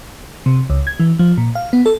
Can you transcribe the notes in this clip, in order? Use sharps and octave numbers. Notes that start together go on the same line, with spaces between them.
C3
C#2
G#6
E3
F3
A#2
F5
B3
A4